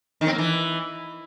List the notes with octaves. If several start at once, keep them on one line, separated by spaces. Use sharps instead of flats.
D#3
C4
A#3
E3